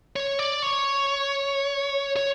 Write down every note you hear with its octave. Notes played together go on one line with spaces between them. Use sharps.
C#5
D5
C#5
C#5